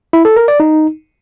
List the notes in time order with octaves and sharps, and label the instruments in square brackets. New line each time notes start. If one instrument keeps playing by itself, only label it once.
[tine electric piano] E4
A4
A#4
D5
D#4